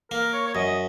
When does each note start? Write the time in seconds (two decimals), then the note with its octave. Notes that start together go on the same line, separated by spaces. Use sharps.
0.11 A#3 A#4
0.33 C#5
0.47 C#5
0.54 F#2 D#5